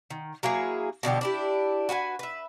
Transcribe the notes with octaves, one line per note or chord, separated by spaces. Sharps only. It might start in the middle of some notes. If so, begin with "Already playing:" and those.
D#3
F#3 A#3 E4 G#4
B2 D3 F3 G4
D4 E4 G4
F#4 B4 F#5 G#5
B4 E5